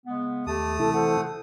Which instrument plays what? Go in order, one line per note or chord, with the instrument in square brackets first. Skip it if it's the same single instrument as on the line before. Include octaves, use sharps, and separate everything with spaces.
[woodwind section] C#3 G#3 B3
[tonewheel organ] D#2 [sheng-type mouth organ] A3 D#6 [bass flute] G4 [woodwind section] A5
[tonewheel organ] C3 E3 E4 [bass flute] A4
[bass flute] A4 [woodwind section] C5 F#5